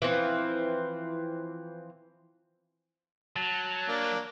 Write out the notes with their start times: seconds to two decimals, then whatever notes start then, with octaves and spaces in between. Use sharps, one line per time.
0.02 E3 F3 C4
3.36 F#3 A5
3.88 A#3 D4